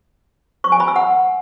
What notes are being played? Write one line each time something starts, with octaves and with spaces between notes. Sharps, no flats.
C#6
G#5
B5
E6
F#5